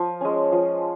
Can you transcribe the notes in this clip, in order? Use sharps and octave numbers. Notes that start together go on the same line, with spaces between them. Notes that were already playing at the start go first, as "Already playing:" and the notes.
Already playing: F3
G#3 C#4
F3